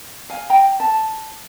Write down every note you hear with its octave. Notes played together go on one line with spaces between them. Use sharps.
F5 G#5
G5 A#5
A5